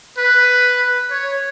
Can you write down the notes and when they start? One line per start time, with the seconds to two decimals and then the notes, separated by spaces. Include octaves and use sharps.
0.18 B4
1.11 C#5